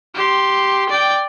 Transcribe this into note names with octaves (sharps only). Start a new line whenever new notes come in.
G4 C6
D5 G5